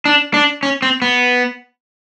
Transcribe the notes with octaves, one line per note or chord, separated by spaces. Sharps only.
D4
D4
C#4
C4
B3